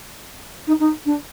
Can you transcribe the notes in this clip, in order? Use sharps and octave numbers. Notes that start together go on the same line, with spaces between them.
D#4
D#4
D4